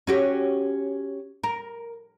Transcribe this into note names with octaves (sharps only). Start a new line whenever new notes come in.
C#4 F#4 G4
A#4